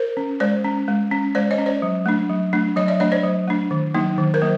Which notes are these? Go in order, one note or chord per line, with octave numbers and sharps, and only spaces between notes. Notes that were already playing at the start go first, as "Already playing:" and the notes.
Already playing: A#4 C5
C#4
G#3 C5 D5
C#4
G#3
C#4
G#3 C5 D5
C#5 D#5
C#4
C5 D5
F#3
A3 D4
F#3
A3 D4
F#3 C#5 D#5
D5 E5
A3 D4 C#5 D#5
C5 D5
F#3
A3 D4
D#3
F#3 A#3 D#4
D#3
A#4 C5
F#3 A#3